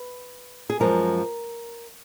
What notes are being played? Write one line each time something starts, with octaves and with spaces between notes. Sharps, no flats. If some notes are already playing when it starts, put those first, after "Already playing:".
Already playing: B4
G#4
F#2 F3 G#3 A#4